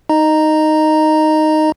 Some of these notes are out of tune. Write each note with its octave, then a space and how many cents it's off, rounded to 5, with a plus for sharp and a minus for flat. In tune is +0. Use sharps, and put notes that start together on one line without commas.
D#4 +0 D#5 -15 A#5 +0